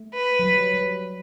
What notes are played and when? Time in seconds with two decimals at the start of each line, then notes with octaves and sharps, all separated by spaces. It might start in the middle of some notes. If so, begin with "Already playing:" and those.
Already playing: A3
0.14 B4
0.39 F#3
0.43 G3
0.74 G3